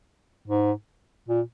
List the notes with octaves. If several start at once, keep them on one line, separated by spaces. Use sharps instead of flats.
G#2
A#2